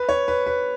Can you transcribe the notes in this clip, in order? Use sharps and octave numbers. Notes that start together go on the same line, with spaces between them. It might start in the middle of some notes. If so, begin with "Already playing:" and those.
Already playing: B4
C#5
B4
B4